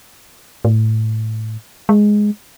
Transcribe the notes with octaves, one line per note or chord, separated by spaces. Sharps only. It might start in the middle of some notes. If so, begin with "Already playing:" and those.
A2
G#3